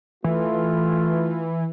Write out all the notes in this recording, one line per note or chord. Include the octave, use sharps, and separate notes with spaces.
E3 A3 F4